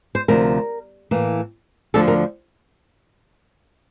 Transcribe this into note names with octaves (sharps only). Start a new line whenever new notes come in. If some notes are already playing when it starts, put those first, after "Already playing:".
C5
D2 C3 F3 A#4
A2 E3 A#3
D2 D3 F3 A4
A#4